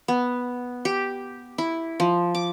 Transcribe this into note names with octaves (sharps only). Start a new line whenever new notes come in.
B3
G4
E4
F3
D6